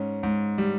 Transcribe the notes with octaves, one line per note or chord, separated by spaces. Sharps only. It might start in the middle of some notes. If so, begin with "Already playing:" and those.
Already playing: G#2 C#4
G#2
G3